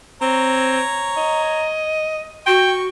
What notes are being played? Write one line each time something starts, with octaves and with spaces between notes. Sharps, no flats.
C4 C#5 A#5
D#5
F#4 G5 C#6